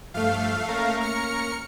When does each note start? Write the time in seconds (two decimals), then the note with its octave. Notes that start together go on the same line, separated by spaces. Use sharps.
0.14 G2 F3 A3 F5
0.69 A#3 C#4 A#4
1.00 F6 C#7